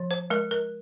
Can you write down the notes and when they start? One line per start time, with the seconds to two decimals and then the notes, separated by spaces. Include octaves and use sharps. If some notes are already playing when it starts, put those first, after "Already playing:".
Already playing: F3
0.11 C5
0.30 G#3 A#4
0.51 A#4